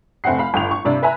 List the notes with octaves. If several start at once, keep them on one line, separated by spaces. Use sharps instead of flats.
F1 C4 E5 F#5 C7
F5 B5
G1 G5 F7
C#6
G2 C3 D4
B4 E5 G#5 A#5 B5